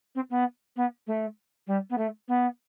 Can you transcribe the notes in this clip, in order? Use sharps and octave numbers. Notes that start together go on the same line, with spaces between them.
C4
B3
B3
A3
G3
B3
A3
B3